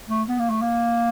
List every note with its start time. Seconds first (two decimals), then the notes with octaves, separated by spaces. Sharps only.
0.09 A3
0.28 B3
0.39 A#3
0.50 A3
0.62 A#3